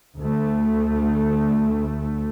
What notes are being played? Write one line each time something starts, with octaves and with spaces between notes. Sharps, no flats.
D2 A3